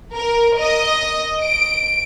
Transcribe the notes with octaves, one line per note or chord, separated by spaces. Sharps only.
A#4
D#5
D7